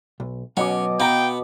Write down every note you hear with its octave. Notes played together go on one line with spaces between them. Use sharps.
B1
B2 F#3 C#4 D#5 F#5 D6
B3 F5 G5 A#5